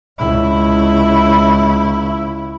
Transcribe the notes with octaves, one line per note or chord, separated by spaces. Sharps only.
C#2 E4